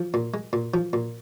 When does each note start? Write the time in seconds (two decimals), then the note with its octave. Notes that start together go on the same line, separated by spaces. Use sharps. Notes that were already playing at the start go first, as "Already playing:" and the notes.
Already playing: F3
0.14 A#2
0.34 G#3
0.53 A#2
0.74 F3
0.93 A#2